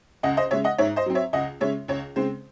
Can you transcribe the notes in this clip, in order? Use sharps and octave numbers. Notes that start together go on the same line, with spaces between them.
C#2 D#5 F#5
C5 D#5
C#3 G#3 C#5 E5
D#5 F#5
G#2 C#5 E5
C5 D#5
F#3 C4
C#5 E5
C#2 D#5 F#5
C#3 G#3 C#4 C#5 E5
C#2 C#5
C#3 G#3 C4 C5